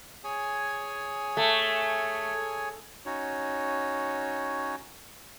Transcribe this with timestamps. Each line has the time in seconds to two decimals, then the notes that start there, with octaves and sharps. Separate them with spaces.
0.24 G#4 C#5 G#5
1.37 A3
3.06 C#4 D#4 F#4 C#5